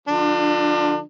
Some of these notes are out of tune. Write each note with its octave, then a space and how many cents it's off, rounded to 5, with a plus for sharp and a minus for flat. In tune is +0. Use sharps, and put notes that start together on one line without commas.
D3 +0 F3 +15 D4 +30